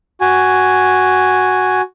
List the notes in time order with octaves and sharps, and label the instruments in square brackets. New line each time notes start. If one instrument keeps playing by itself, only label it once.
[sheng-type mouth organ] F#4 G#5